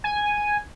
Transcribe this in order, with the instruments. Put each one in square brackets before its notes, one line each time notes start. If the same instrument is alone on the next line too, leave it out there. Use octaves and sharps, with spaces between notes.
[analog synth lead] G#5